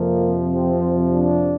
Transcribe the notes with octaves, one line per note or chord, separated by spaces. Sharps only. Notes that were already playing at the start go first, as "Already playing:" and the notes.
Already playing: F2 C3 F3 A#3
C4
D4